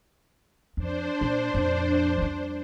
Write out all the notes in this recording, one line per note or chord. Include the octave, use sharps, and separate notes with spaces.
F2 D4 C5
A#2
F2 A#2
F2 G3